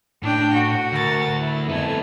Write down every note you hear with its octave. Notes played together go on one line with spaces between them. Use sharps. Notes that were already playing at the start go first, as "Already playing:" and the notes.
A2 D4 G5
F#4
D2 A2 A#4 A6
E4
F2 A3 B3 A4 G#6